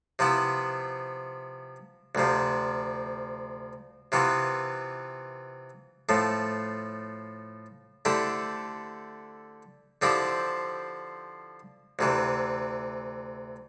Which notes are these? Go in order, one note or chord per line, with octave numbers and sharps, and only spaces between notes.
C3 F3 B3 E4
D2 C3 F3
C3 E3 B3 F4
A2 F3 A3
D3 A3 E4 G4 C5
D3 F3 C4 E4 G4
D2 C3 E3